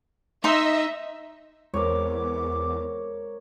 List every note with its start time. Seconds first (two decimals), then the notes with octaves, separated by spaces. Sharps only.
0.44 D#4 D#5 E5 C6
1.74 E2 G#3 A#4 C5 C#5 D6